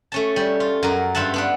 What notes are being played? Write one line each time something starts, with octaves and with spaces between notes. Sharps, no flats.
A3 C#4 A5
G3
F4
F#2 A#4
G2 F4 E5 F#5 A5
B3 D4 F#5